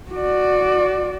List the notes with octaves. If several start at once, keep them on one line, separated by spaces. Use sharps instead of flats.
F#4 D5